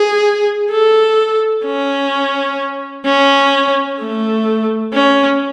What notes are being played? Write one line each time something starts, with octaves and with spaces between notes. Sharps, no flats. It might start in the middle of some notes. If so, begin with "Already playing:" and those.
Already playing: G#4
A4
C#4
C#4
A3
C#4